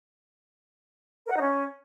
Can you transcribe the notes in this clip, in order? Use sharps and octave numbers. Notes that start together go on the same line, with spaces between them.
A#4
F#5
D#4
C#4